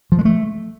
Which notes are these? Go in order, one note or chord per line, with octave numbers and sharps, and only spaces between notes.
F3
G#3
A3